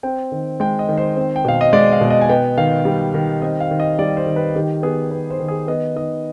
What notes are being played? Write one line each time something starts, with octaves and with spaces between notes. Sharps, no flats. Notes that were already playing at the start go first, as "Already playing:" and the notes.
C4 G5
D#3
G#3 G5
D#5
D#3
C5
C4
G5
B2 F5
D#5
G#3 D5
F5
B2
D#5
G#5
B3 G5
D#3 F5
G3
D#3
C4 D#5
F5
D#3
D#5
G3 D5
C5
D#3
B4
D#3 G4
B3 G#4
B3 B4
C5
D#3
G#4
B3 D#5
D#3 D#5